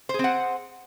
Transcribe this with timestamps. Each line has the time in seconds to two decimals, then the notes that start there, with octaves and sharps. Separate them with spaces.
0.09 C5
0.14 G#4
0.19 C4
0.24 F#5